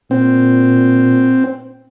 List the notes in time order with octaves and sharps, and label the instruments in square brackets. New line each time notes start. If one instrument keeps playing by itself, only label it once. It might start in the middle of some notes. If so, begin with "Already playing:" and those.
[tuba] A#2 [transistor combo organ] C4